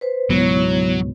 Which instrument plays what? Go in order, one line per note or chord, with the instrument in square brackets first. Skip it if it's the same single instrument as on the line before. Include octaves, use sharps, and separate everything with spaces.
[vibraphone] B4 C5
[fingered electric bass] C#2 G#2 B2 [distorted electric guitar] F#3 [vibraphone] B3 E4 C#5